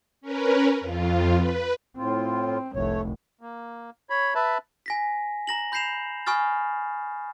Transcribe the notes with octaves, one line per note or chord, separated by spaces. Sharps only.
C#4 A#4 B4
F2 F4
B4
A2 C4 F4
F1 C2 A3 C#5
A#3
C#5 B5
B4 E5 A5 B5
G#5 A#6 B6
A#5 A#6 F#7
B5 G6 A#6 C7 E7 F7
G#5 B5 C#6 D#6 F6 A6